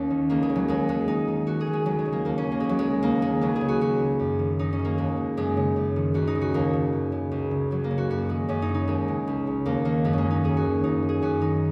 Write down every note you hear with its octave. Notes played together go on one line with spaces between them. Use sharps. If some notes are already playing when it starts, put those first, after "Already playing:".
Already playing: D#2 A#3 C#4
D#3
C#2 A#3
G#3
C#3
F#3
D#2 G#3
D#3 G#3
D#2 D#4
D#3
D#2 F#4
G#4
D#3
G#3
C#2 F#3
G#3
C#3
A#3
D#2 A#3
C#4
D#3
A#3
C#2 G#3
F#3
C#3 G#3
D#2 A#3
D#3 G#3
C#2 F#3
G#4
C#3
F#4
C#2 F#4
C#3
F#2
D#3
F#2 D#4
C#4
D#3
A#3
D#2 G#3
C#3
F#2 G#3
C#3
F#2
D#3
C#2 F#4
D#4
C#3
F#4
D#2 A#3
C#3
F#2
C#3
C#2
C#3
C#2 F#3
A#3
C#3
F#4
F#2 F#4
D#3 G#3
F#2 C#4
D#4
C#3
D#4
D#2 G#3
C#3
C#2
C#3
D#2 A#3
D#3 A#3
F#2 G#3
C#4
A#3
D#3
D#4
D#2 G#4
F#4
D#3
F#2 D#4
D#3
G#4
F#2 F#4
D#3 D#4